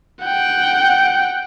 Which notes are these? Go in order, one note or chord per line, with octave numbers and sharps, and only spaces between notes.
F#5 G5